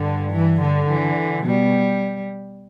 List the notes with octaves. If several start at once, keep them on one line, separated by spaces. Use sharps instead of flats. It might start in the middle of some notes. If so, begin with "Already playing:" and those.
Already playing: G2 D3
E3
D3
E3
B2 G3